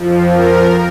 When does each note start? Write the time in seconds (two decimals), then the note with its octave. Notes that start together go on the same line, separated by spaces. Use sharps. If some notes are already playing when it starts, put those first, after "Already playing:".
Already playing: F2 F3
0.29 A#4